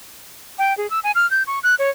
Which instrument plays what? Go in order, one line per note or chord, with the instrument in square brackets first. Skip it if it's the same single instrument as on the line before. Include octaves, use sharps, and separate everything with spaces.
[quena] G5
G#4
E6
G#5
F6
G6
C#6
F#6
C#5